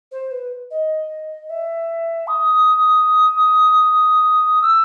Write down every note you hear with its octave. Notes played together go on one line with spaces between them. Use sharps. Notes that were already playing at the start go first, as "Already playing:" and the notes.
C5
B4
D#5
E5
D#6
E6